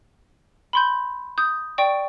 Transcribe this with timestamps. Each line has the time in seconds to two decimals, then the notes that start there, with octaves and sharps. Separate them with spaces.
0.73 B5 C6 G6
1.38 D#6 G6
1.78 D5 G5 C#6 D7